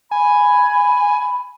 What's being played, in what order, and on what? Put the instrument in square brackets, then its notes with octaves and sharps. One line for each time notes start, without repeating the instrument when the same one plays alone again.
[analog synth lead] G#5 [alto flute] B5